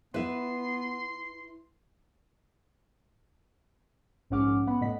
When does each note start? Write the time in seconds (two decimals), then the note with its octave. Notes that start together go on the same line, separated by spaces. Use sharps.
0.14 B3 E4 B4 E5 C6
4.30 A#1 G#2 C#4 F#5 D6 F6
4.67 B3 F#5 B5
4.81 A2 D#5 F#5 B6